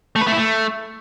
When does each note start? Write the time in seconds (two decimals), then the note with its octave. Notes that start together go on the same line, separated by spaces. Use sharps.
0.16 A3
0.21 B4
0.27 A3
0.32 E4
0.37 A3